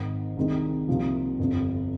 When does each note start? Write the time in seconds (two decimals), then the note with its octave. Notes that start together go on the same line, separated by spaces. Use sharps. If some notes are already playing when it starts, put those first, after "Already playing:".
Already playing: G#1 G#2 D#3
0.37 C2 C3 D#3 G#3 D#4
0.88 C2 C3 F3 A#3
1.39 G1 F2 C3